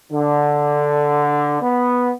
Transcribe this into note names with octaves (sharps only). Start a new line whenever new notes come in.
D3
B3